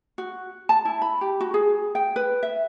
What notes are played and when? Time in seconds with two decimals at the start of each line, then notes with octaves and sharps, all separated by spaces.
0.18 F#4
0.69 A5
0.85 E4
1.02 B5
1.21 G4
1.41 F#4
1.54 G#4
1.95 G5
2.16 B4
2.43 E5